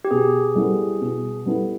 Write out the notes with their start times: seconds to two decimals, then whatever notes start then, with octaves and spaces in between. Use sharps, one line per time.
0.05 G4
0.11 B2 G#4
0.55 G3 B3 E4 A4
1.01 B2
1.46 G3 B3 E4 A4